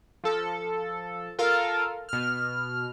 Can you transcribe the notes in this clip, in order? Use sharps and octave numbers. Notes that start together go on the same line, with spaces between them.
F3 A4
F4 A4 A#4 F5
B2 F6